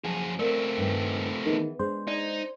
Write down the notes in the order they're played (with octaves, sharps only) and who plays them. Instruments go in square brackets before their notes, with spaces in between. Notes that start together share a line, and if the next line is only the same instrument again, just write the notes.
[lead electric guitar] F#2 G#4 [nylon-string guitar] F3 F#3 A5
[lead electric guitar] A3 C4 [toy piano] A#4 [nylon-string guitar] D5
[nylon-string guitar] G2 D#3 G3
[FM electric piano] D#3 [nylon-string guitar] E3 B3 G#4
[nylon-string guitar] G#3 D4 G#4 [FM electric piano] C5
[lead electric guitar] D#4 [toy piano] D5